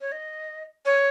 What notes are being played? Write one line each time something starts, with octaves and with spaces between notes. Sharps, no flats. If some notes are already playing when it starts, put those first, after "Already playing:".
C#5
D#5
C#5